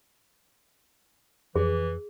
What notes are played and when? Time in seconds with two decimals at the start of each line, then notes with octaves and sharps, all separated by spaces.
1.56 F2 E3 G#4